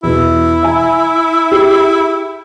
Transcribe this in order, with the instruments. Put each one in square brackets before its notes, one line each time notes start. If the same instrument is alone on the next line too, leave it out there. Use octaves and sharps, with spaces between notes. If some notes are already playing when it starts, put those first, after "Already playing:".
[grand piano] E2 B2 [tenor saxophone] E4
[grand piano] E5 G#5
G4 G#4